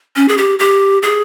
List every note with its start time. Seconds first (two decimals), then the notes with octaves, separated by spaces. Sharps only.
0.16 C#4
0.28 G#4
0.38 G4
0.59 G4
1.03 G#4